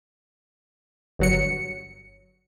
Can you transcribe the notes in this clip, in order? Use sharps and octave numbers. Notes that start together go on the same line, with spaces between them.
G1 F#3 C#7